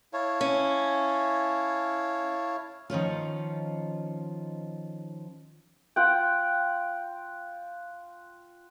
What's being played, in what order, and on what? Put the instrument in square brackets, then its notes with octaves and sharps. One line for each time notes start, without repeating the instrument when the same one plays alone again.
[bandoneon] E4 F5 A5 [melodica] C#5
[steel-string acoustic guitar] C#4
D#3 F3 C#4 F4
[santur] F4 F#5 G5